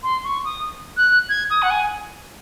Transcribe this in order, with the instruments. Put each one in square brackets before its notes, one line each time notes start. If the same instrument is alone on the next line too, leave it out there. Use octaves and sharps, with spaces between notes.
[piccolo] C6
C#6
D#6
F#6
G#6
D#6
F#5
G#5